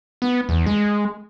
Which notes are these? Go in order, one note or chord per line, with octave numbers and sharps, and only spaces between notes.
B3
E2
G#3